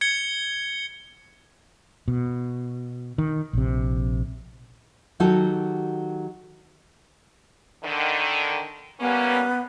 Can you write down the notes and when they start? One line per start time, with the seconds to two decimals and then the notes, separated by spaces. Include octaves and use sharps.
0.01 G#6 C#7 G7
2.08 B2
3.18 D#3
3.53 A#1 C3
5.20 D#3 F#3 D#4 F#4 G4 A4
7.84 D3 D#3
9.00 G3 A#3 B3 C#4